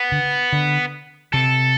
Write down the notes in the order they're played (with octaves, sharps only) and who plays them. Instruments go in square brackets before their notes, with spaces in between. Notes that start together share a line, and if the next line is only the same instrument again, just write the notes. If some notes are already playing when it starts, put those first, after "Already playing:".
Already playing: [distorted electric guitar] B3
[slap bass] D3
D3
[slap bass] C3 [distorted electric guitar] A4